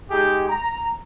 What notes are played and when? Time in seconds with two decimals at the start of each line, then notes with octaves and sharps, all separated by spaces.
0.11 G#3 D#4 G4 G#4
0.49 A#5